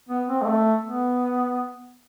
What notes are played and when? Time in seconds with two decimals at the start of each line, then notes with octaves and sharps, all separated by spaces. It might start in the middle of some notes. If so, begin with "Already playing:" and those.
0.09 B3
0.28 C4
0.42 G#3
0.46 A3
0.84 B3